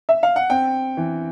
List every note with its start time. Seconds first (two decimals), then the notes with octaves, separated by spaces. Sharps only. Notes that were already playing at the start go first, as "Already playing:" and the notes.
0.09 E5
0.23 F5
0.36 F#5
0.50 C4 G5
0.97 E3